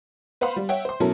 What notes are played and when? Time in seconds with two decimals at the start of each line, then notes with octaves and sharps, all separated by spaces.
0.41 B4 C5 F5 F#5 B5 C6
0.56 G3
0.69 C#5 E5 F#5 G5
0.85 C5 C6
1.00 B2 F#3 C#4 E4 A4 A#4